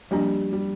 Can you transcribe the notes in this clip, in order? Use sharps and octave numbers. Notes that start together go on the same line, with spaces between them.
F3 G3 A#3 D4
G3